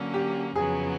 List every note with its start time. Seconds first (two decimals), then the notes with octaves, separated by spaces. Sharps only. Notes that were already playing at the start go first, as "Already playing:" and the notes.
Already playing: D3 F#3 A#3 C#4
0.14 G4
0.55 F2 C#3 F#3 B3 G#4